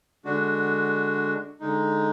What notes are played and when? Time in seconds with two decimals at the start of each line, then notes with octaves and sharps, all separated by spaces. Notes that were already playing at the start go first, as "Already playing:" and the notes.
0.25 D3 G#3 D4 F#4
1.60 D3 G#3 D#4